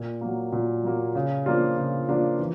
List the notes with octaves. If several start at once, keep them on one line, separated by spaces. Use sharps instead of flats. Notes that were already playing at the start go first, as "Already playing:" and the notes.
Already playing: A#2
F#3 A#3
A#2
F#3 A#3
C#3
F3 A#3 D4 F4
C#3
F3 A#3 D4 F4
E3